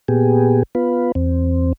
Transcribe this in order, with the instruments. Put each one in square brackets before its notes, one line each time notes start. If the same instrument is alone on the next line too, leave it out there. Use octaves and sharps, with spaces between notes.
[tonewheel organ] A#2 B3 G4 G#4
B3 F4 B4
E2 C4